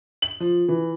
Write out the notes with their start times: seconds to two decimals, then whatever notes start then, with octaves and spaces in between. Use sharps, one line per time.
0.22 F#7
0.40 F3
0.68 E3